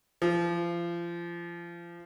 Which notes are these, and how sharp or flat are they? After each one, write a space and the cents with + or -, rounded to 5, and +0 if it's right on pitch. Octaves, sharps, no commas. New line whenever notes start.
F3 -30